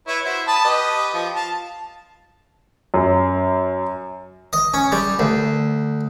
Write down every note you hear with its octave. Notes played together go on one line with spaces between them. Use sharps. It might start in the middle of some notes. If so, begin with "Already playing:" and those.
E4 B4 C#5
E4 F#4 C5
A5 B5 D#6
G4 B4 D#5
F3
F4 A5
F#2
D#5
C#4
G3
D2